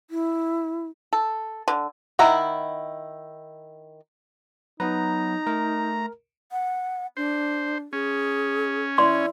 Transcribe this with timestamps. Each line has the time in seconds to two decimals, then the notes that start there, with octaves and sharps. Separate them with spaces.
0.10 E4
1.13 A4
1.68 D3
2.19 D#3 E4 F#5 A#5
4.80 F#3 B3 D#4 B4 A#5
5.47 A3 A#4
6.52 F#5
7.17 D4 C5
7.93 C#4 G#4
8.98 E4 D5 C6